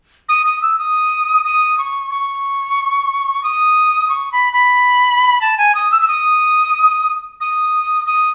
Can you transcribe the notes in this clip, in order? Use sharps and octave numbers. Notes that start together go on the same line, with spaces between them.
D#6
D#6
E6
D#6
D#6
C#6
C#6
D#6
C#6
B5
B5
A5
G#5
D#6
E6
E6
D#6
D#6
D#6